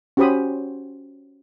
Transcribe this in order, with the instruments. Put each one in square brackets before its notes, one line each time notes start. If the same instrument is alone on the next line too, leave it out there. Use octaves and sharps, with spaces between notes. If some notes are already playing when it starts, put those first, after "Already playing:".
[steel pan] C#4 F#4 G4 C5 B5 D#6